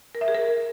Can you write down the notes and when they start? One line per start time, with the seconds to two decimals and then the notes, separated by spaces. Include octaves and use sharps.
0.15 A#4
0.21 E5
0.28 G#4
0.34 A#4